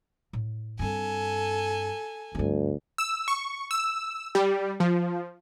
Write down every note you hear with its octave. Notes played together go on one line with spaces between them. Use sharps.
A2
G2 C4 A4 G#5
D2 G2 C4
E6
C#6
E6
G3
F3